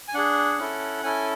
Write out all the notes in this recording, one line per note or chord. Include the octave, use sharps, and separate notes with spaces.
G#5
D4 G#4 F#5
C#4 E4 A4
C#4 E4 A4 G#5